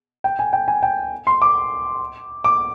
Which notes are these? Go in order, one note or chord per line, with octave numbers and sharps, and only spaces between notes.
G5
G#5
G5
G#5
G5
C6
D6
D6